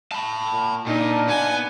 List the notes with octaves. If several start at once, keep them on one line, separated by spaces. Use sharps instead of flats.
A5 B5
A#2
A#2 D4 D#4
B3 G#5